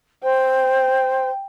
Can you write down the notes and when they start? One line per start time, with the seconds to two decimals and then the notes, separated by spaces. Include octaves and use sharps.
0.23 C5 G5